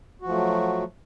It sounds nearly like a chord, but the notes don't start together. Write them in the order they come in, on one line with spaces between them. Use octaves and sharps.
F#4 F3 A3 F#3